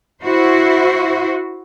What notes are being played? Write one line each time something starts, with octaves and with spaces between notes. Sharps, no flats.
E4 F#4 C5